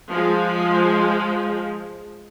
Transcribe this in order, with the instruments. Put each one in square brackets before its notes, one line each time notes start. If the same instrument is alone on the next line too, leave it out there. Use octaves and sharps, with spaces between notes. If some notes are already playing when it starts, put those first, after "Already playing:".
[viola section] F3 G#3